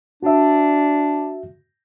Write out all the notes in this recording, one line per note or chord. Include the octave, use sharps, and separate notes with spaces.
D4 F#4 E5